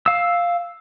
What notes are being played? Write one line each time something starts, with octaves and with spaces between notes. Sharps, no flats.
F5 E6